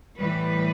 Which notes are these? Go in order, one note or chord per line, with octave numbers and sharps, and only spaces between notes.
A2 E3 G3 B4